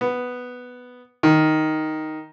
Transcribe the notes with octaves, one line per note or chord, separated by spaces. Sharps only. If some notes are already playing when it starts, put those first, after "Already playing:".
B3
D#3